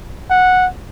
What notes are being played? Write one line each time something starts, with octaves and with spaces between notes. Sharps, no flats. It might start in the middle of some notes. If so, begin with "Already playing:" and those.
F#5